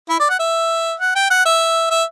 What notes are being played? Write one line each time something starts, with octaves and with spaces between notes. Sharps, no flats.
E4
D5
F#5
E5
F#5
G5
F#5
E5
E5